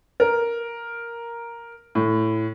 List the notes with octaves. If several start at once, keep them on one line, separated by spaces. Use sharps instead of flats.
A#4
A2